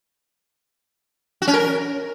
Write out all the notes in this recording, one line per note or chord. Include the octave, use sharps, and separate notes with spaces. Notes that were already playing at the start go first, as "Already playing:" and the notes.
F#4
C#4
A#4